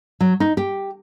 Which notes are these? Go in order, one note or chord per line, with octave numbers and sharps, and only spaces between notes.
F#3
D#4
G4